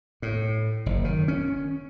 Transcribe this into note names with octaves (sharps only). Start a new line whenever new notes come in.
A2
F#1
D#3
C#4